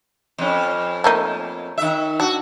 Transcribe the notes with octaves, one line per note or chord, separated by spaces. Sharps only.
F2 C#4
A3 A#3 D#4
D#3 E5
D4 F#4